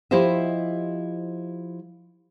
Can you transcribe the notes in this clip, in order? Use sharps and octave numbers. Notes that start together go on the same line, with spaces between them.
F3 E4 G4 C5 D#5 E5